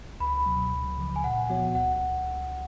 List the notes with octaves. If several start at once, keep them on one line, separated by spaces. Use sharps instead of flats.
C#2 B5
B2 F#3
C#2
C#3 F3
G#5
A#2 F#5
F3 B3 F#4 C#5 F#5
C#2 F#5